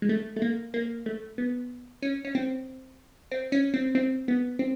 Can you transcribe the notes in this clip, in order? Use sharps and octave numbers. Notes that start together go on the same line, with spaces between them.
G#3
A3
A3
A#3
A#3
A3
B3
C#4
C#4
C4
C4
C#4
C4
C4
B3
C4